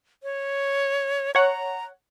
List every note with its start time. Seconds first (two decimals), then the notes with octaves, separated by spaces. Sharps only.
0.23 C#5
1.35 C#5 F#5 A#5